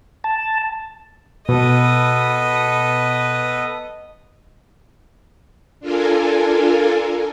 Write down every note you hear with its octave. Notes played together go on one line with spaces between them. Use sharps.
A5
B2 B3 A4 B4 D#5
D4 F4 A4 A#4 G#5